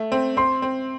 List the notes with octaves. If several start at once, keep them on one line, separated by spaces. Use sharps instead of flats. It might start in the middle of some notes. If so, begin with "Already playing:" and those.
Already playing: A3
C4
C4 C6
C4